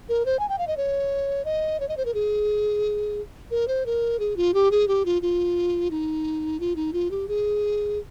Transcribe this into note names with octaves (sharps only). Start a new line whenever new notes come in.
A#4
C5
G#5
G5
F5
D#5
C#5
D#5
C#5
D#5
C5
A#4
G#4
A#4
C5
A#4
G#4
F4
G4
G#4
G4
F4
F4
D#4
F4
D#4
F4
G4
G#4